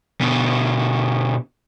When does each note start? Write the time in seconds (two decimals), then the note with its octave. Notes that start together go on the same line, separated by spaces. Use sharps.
0.21 B2 D3